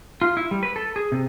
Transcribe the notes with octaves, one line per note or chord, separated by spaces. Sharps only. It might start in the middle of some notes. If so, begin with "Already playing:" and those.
F4
E4
G3
B4
A4
G#4
C3